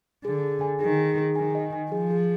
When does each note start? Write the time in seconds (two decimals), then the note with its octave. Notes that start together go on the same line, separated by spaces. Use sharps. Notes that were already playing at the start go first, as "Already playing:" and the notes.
0.25 D3 G#4
0.43 G#4
0.61 G#5
0.81 D#3 G#4
0.99 G#4
1.18 G#4
1.36 D#3 G#5
1.55 D#5
1.73 G#5
1.92 F3 G#4
2.11 G#4